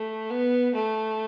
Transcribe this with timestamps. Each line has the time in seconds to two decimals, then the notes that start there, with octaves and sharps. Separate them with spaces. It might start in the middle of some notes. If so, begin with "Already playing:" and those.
Already playing: A3
0.30 B3
0.75 A3